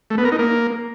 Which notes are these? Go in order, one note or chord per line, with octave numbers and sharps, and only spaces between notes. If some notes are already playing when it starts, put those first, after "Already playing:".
A3
B3
A#4
D#4
A#3